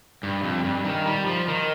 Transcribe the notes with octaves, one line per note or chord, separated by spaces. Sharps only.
G2
F2
G2
D#3
G3
F3
D#3